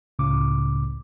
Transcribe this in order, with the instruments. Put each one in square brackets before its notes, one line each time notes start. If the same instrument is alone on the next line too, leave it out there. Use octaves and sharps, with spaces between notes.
[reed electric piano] C#2 A2 C#3 D6